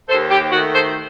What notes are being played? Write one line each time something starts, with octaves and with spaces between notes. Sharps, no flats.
D#2 A4 C5
G4
D#3 A3 F#4
A4 C5